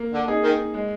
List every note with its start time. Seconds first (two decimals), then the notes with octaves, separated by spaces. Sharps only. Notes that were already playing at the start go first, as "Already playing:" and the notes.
Already playing: A#3
0.13 D3
0.28 D#4 G#4
0.43 D#3
0.74 G#3